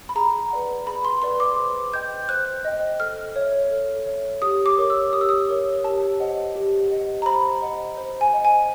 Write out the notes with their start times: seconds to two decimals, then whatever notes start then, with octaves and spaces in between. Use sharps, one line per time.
0.09 B5
0.15 G#4 A#5
0.51 B4 D5 F#5
0.87 G#4 B5
1.05 C6
1.22 B4 D5 F#5 C6
1.40 D6
1.58 C5
1.93 D#5 G5 G6
2.29 C5 F#6
2.65 D#5 G5
3.00 A4 F6
3.36 C#5 E5
3.71 A4
4.07 C#5 E5
4.42 G4 D#6
4.66 D6
4.78 A#4 C#5
4.90 E6
5.13 G4 D#6
5.21 E6
5.29 D#6
5.49 A#4 C#5
5.84 G4 A5
6.20 C5 D#5 F#5
6.55 G4
6.91 C5 D#5 F#5
7.22 A#5
7.26 C5 B5
7.62 D#5 F#5
7.97 C5
8.21 G#5
8.33 D#5 F#5
8.45 G#5